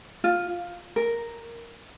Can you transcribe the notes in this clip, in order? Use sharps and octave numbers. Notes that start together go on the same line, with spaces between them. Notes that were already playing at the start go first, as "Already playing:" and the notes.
F4
A#4